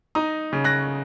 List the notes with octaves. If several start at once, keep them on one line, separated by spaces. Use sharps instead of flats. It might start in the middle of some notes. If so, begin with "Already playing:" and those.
D#4 A#5 D#6
C#3
F#6 A#6